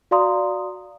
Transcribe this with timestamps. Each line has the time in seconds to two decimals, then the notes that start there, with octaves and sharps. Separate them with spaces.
0.11 F#4 D5 F5 A#5 C6 D#6